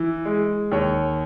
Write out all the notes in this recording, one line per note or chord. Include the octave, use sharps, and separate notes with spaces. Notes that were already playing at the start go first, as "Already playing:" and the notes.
Already playing: E3
G#3
D#2 C#5